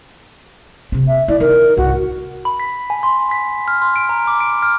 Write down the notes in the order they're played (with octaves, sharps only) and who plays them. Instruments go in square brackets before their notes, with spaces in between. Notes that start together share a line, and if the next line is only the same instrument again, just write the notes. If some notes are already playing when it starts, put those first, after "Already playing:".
[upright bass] C3 C4
[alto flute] E5
[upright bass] E4 [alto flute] D5
[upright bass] D#3 [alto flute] A#4
[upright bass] C2 G#2 [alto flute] F#4
[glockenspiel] B5
B6
G#5
C6
B6
F6
C6
D7
A#5
D6
D7
F6